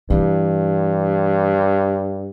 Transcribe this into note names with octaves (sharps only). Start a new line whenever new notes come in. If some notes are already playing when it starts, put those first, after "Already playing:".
G2 E3